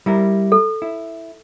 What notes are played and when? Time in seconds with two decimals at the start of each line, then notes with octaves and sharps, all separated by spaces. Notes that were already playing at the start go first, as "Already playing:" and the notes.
0.06 G3 E4 A#4
0.52 A4
0.82 E4